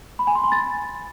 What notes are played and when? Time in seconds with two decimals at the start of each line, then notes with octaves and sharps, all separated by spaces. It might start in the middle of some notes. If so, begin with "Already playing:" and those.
0.19 B5
0.27 G#5
0.35 C6
0.44 B5
0.52 A6